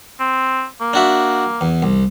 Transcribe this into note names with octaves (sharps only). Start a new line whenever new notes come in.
C4
A#3
D4 F#4 E5
E2
C2